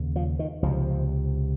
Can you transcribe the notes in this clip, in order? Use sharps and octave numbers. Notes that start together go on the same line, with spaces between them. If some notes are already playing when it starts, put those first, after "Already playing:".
Already playing: D#2 C#3
F3
D#3
C#2 C3 F3